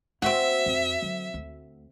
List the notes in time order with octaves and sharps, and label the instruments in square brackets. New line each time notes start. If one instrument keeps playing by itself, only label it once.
[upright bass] A#3 E4 [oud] C4 F#4 [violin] E5
[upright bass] F2
D3 F#3
D2